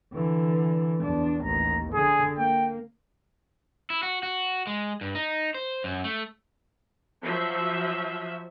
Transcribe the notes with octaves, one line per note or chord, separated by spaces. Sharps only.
D3 E3
E2 D4
A1 D#2 A#5
D3 G#4
A#3 G5
E4
F#4
F#4
G#3
G2
D#4
C5
F#2
A3
F3 F#3 E5